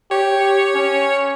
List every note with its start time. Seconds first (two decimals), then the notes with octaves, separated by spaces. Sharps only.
0.11 G4 C#5
0.75 C#4